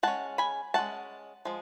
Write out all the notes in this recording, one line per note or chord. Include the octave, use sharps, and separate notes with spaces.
G#3 C#4 F#5 A5
G#5 B5
G#3 C#4 F#5 A5
F3 G#3